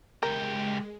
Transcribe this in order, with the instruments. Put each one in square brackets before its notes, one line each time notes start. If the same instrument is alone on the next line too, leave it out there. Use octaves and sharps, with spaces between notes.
[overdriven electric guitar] C#2 G4 [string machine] G#3 [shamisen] A#4